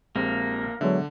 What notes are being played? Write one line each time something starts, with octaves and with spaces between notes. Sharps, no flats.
A#1 G#3 A#3 C4 G4
D3 F#3 G#3 B3 E5